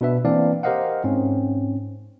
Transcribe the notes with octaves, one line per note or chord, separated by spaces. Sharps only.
B2 D4 B4 E5
E3 A#3 C4 D4 D5 F5
G4 A#4 C5 D#5 F5 F#5
G#2 C4 C#4